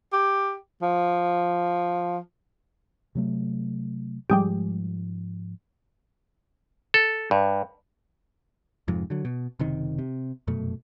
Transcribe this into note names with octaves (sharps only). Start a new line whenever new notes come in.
G4
F3
C3 F#3 A3
G#2 F3 G3 G#3 G4
A4
G2
F1 F2 G#2 F3
D3 F#3
B2
F#1 C3 D#3
C3
F1 F#2 B2 A3